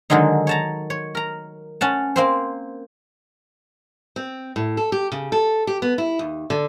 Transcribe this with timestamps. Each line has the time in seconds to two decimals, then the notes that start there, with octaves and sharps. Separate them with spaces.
0.10 D3 D#3 F#3 G#3 D#4
0.47 C#5 A5 A#5
0.90 C#5
1.15 A#4 A#5
1.81 C#4 F#5 A5
2.16 A#3 C4 C5
4.16 C4
4.56 A2
4.77 A4
4.92 G4
5.12 C#3
5.32 A4
5.67 G4
5.82 B3
5.98 E4
6.19 D#2
6.50 D3